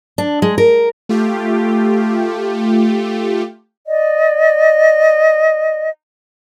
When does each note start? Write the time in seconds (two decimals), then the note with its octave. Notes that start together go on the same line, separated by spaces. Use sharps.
0.18 D4
0.42 G#3
0.58 A#4
1.09 A3 F4 G4
3.86 D5 D#5